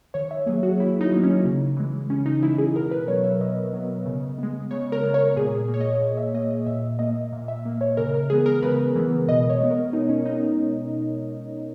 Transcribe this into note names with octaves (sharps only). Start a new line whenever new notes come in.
D#3 C#5
E5
F#3 A#3 G#4
F#4
D#3 E4
D#4
F#3 A#3
C#4
C#3
E3 G#3
C#3 C#4
D#4
E3 G#3 E4
G#4
B2 A#4
B4
F#3 B3 C#5
E5
B2 D#5
F#3 B3
C#3
G#3 B3
C#3 C#5
A#4
G#3 B3
C#5
A#2 G#4
A#3
C#5
D#5
A#2
E5
A#3 D#5
D#5
A#2 E5
A#3 D#5
A#2
E5
A#3
C#5
C#3 A#4
A#4
E3 G#3 B3 G#4
A#4
C#3 B4
E3 G#3 B3
B2 D#5
C#5
G#3 B3
A#4
B2 D#4
C#4
G#3 B3 D#4